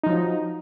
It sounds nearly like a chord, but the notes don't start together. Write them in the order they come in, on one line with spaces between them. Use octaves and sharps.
D#4 F3 F#3